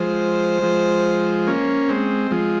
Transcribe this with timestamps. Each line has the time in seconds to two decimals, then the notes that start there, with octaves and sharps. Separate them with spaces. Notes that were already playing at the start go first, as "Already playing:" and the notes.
Already playing: F3 G#3 C5
0.62 F3 G#3
1.47 A#3 C#4
1.88 G#3 C4
2.31 F3 G#3